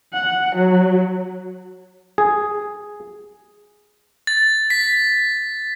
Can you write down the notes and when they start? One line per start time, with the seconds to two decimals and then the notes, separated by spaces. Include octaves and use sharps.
0.13 F#5
0.56 F#3
2.18 G#4
4.27 A6
4.70 B6